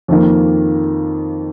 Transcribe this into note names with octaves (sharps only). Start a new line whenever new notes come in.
F2 D#3 A#3